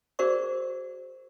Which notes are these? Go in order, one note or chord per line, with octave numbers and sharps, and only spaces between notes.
F#4 G#4 A#4 C5 D5 C#6